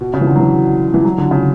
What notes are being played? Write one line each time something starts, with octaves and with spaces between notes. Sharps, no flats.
B2
C#3
E3
D3
F#3
E3
E3
F#3
D3
C#3